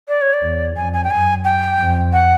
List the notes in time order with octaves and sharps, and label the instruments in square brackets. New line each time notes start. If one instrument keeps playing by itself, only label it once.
[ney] D5
C#5
D5
[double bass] E2
[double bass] F2 [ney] G#5
[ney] G#5
G5
[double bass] F#2 [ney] G#5
[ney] G5
[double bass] F2
[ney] F#5